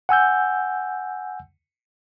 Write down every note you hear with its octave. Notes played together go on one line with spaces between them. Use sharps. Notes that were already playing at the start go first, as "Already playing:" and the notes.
F#5 G#5 E6 G6